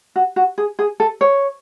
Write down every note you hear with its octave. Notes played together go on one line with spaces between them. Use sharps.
F#4
F#4
G#4
G#4
A4
C#5